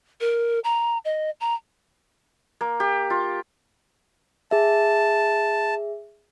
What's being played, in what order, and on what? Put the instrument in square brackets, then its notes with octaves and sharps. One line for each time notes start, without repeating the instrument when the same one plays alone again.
[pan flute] A#4
A#5
D#5
A#5
[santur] A#3
G4
F4
[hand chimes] G#4 E5 [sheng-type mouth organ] A5